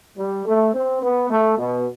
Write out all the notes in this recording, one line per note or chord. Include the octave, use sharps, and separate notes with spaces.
G3
A3
C4
B3
A3
B2